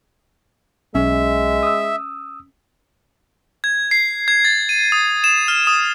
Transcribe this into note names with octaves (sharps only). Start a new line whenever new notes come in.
B1 G#3 C#4 E5
D#6 E6
G#6
C7
G#6
A6
D#7
D#6
E7
F6
D#6